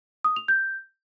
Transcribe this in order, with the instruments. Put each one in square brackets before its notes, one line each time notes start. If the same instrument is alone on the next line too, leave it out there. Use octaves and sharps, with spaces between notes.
[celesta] D#6
F7
G6